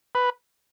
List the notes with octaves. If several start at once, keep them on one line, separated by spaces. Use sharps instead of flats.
B4